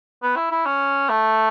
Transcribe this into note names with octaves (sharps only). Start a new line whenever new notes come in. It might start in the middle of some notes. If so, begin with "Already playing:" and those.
B3
E4
E4
C#4
A3